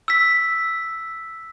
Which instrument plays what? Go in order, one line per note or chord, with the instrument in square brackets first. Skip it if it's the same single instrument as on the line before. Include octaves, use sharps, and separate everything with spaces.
[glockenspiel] E6 B6